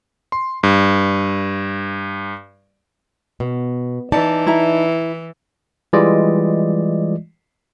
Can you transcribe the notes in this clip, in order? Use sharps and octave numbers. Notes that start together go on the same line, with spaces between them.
C6
G2
B2
E3 D#4 D5 A5
E4 A#5
E3 G3 G#3 F4 D5 D#5